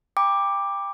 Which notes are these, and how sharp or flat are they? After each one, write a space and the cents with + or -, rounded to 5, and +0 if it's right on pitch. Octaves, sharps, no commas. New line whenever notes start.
G5 +25 B5 -40 D6 +5